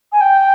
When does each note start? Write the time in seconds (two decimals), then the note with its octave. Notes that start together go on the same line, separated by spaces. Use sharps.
0.12 G#5
0.21 G5